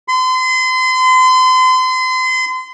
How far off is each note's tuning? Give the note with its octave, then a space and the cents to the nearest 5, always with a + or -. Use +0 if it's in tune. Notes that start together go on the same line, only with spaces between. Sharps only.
C6 -35